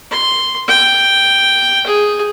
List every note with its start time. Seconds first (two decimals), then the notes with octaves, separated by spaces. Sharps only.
0.11 C6
0.68 G5
1.86 G#4